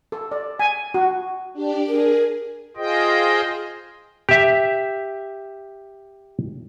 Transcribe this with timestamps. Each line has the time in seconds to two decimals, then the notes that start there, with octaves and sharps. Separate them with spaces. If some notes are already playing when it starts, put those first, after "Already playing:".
0.12 A4
0.31 D5
0.60 G#5
0.94 F#4
1.53 D4 G4 D5
1.88 G#4 A#4
2.77 F4 G#4 C5 D#5 G5
4.29 G4 E5